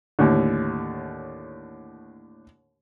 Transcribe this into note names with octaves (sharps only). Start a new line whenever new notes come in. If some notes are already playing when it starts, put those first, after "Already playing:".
D#2 A2 D3